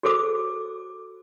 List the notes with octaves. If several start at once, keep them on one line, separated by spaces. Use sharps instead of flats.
F#4 G#4 A4 C5 D6 E6